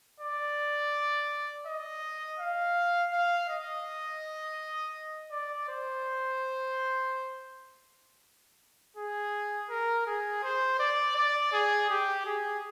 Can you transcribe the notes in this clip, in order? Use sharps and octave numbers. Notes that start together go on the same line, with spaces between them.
D5
D#5
F5
F5
D#5
D5
C5
G#4
A#4
G#4
C5
D5
D5
G#4
G4
G#4